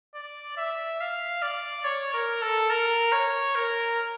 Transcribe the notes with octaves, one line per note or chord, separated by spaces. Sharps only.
D5
E5
F5
D5
C#5
A#4
A4
A#4
C#5
A#4